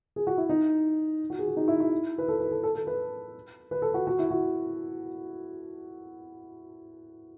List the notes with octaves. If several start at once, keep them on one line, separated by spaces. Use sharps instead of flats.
G#4
F#4
E4
D#4
F#4
G#4
F#4
D#4
E4
E4
B4
A4
B4
A4
A4
A4
B4
B4
A4
F#4
F#4
E4
F#4